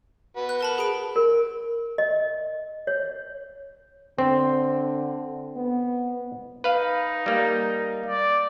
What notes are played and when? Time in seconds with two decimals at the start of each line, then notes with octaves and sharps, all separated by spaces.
0.36 F#4 B4
0.49 F#6
0.61 A#4 A5 B5
0.78 G#4 B5 D7
1.16 A#4
1.98 D#5
2.87 C#5
4.18 D3 C4
5.56 B3
6.64 D#4 B4 F5
7.26 G3 A#3
8.06 D5